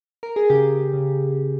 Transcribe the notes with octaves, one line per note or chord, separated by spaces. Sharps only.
A#4
G#4
C#3 G4
C#3